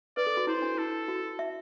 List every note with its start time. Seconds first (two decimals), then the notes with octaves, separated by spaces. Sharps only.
0.17 B4 D5
0.27 A4
0.37 F#4
0.47 E4 C5
0.62 D4
0.78 E4 A4
1.08 F#4
1.39 E5